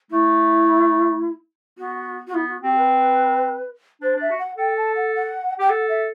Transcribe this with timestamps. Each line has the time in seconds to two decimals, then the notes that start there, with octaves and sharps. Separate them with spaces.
0.11 A3 E4
1.78 B3 F#4
2.27 F#4
2.34 B3 E4
2.48 F#4
2.62 C4 G4
2.76 B4
4.02 D4 C5
4.16 D4
4.21 E5
4.30 F#4
4.39 F#5
4.58 A4 G5
4.77 A5
4.95 F#5
5.14 F#5
5.59 G4 G5
5.70 A4 F#5
5.89 E5